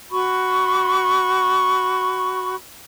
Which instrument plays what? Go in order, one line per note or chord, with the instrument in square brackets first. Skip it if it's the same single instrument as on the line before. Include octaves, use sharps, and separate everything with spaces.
[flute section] F#4 B5 C#6